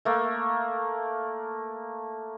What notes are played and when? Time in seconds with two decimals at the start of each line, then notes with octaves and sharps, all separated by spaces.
0.05 A3 A#3